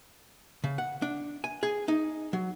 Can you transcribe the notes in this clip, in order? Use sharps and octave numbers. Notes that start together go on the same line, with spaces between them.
C#3
F#5
D4
G#5
G#4
D#4
F#3